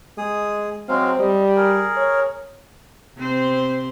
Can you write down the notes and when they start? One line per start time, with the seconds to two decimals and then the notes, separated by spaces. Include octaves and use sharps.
0.18 G#3 G#4 D#6
0.88 F#3 G#3 C4 F5
1.19 G3 D#5
1.56 G#4 A#4
1.97 C#5
3.17 C3 C4 C5